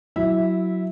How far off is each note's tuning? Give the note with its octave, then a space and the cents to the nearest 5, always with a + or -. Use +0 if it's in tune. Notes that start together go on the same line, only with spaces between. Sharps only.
F#3 +0 E4 +0 E5 -15